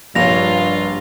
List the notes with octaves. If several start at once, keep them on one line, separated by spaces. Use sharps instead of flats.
A#1 G2 F4 C#5 A#6 F7